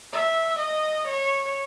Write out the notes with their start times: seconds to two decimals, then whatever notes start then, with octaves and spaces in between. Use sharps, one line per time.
0.12 E5
0.60 D#5
1.08 C#5